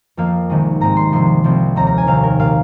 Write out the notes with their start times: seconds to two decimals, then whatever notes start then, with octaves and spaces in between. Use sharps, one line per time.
0.17 F2 F3 A#3 F5
0.50 C2 C3 D#3 G#3
0.81 G#2 G#3 C4 A#5
0.97 C6
1.12 C2 C3 F3 C6
1.44 C2 C3 F3 C4
1.76 D#2 D#3 C4 A#5
1.87 A#5
1.98 G#5
2.07 C2 C3 D#3 F5
2.23 A#4
2.39 A#2 A#3 F5